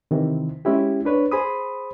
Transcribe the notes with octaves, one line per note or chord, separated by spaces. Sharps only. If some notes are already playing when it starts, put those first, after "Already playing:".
C3 D#3 E3
G#3 C#4 E4 G4
D4 B4 C#5
G#4 C5 B5 D#6